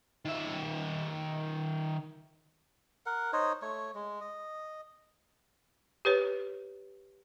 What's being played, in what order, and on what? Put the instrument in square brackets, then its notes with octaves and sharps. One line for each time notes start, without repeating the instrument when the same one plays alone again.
[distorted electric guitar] D#3 E5
[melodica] A#4 F#5
D#4 C5 C#5 D#5
A3 C#5
G#3
D#5
[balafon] G4 B4 C#5